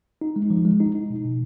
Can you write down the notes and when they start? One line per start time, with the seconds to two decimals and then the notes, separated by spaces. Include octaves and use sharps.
0.21 D#4
0.36 G#3
0.50 F3
0.65 G#3
0.80 D#4
0.95 D#4
1.10 B2
1.25 B2